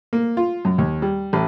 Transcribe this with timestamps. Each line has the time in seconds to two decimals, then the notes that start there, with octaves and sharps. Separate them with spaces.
0.13 A#3
0.37 F4
0.65 F#2
0.78 D#2
1.02 G3
1.33 A1